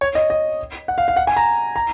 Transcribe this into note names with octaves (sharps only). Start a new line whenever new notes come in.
C#5
D#5
D#5
F#5
F5
F5
F#5
G#5
A#5
A#5